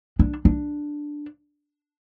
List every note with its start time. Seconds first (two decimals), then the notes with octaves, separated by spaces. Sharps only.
0.19 D4
0.45 D4